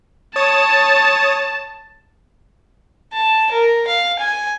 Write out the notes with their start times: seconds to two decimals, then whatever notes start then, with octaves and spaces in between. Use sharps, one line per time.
0.36 C#5 A5 D#6 A6
3.13 A5
3.52 A#4
3.87 F5
4.19 G#5